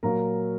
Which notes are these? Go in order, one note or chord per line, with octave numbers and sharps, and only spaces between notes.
A#2 F#3 A#4 A#5